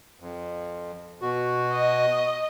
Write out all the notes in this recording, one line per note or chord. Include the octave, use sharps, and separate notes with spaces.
F2
B2 F#4
D#5